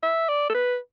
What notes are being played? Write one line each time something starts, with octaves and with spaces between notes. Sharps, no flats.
E5
D5
A4
B4